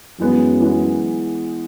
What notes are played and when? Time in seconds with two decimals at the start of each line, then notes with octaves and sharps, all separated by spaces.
0.19 F#2 E3 G#3 B3
0.60 E3 G#3 B3